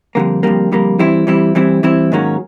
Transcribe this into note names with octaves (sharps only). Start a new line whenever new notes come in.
F2 D3 G3 A#3
F2 D3 G3 A#3
F2 D3 G3 A#3
E3 G3 C4 E4
E3 G3 C4 E4
E3 G3 C4 E4
E3 G3 C4 E4
G#2 D#3 F#3 A#3 C#4